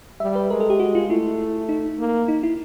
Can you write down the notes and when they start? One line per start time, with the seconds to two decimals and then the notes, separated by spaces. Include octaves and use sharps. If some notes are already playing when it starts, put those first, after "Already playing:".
0.20 G3 E5
0.35 B4
0.50 G#3 A#4
0.60 A4
0.70 G4
0.80 F#4
0.95 F4
1.10 A3 E4
1.69 D#4
1.99 A#3
2.28 D#4
2.43 E4